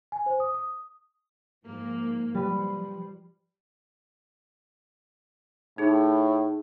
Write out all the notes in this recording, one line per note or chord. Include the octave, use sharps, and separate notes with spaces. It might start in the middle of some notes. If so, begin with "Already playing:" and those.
G#5
C5
D#6
D#6
G#2 F3 A#3
F3 G3 B4
A2 D#4 G#4